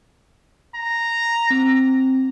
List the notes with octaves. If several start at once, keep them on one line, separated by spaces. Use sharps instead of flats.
A#5
C4